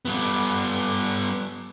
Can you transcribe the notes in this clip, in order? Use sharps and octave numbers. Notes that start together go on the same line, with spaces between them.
G3 B3